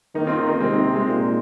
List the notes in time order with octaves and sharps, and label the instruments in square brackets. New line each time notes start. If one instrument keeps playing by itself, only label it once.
[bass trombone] D#3 [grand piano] A#3 D#4
[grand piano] C4 F4
C4 F4
A#3 D#4
[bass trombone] C3 [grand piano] G#3 C4
[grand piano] G#3
G#3
[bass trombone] A#2